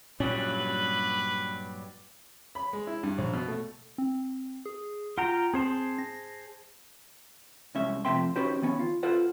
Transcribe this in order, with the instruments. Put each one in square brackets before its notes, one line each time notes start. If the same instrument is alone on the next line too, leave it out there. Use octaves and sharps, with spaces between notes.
[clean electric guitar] G2 F#3 G3 [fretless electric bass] A#2 C#4 [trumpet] B4 [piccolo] F#7
[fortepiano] B5
G#3
E4
G2
A#1
B2
A3
[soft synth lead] C4
G#4
[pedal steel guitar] F4 G5 A#5 [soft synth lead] F#5
[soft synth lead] C4 [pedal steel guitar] G#4 C5 A5
[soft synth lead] A#6
[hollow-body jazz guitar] C2 G#3 C#4 E5
F2 C3 A3 E5 G5 C6
C#4 D#4 F#4 G4 B4 C5
D#3 B3 C#4
F4
F4 A4 B4 C5 F#5